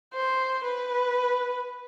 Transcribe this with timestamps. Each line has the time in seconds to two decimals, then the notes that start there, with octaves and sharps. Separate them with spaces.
0.13 C5
0.64 B4